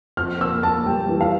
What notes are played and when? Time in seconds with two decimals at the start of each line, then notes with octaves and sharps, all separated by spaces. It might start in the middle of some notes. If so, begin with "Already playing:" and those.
0.17 F2 F6
0.41 A#3 E6
0.63 A#3 A5
0.86 G3 G5
1.09 E3
1.21 F5